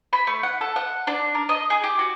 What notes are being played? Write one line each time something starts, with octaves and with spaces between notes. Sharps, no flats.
B5
A3
F#5
A4
F#5
D4
A#4
D#5
G#4
G4
F#4